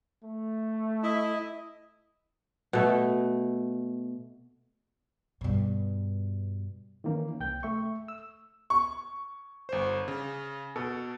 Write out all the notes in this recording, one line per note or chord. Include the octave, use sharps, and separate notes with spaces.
A3
E4 D#5
B2 A3
G2 B2
D#3 E3 A#3 C#4
C2 G5 G6
A3 E5 C#6
E6
C#6
G1 C5
C#3
B2 A4